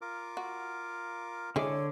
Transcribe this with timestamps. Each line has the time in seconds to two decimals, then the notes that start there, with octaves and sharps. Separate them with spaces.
0.02 F4 A#4 D6
0.37 F#4
1.56 D3 G#3 E4 G#4 A4 C#5 D6